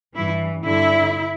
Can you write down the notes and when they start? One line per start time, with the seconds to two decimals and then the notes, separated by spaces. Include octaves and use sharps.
0.15 G2 E3 E4
0.64 G2 D3 E4